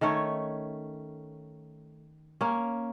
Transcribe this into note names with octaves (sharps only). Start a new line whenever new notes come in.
D#3 A3 C#4 C#5
A#3 C#4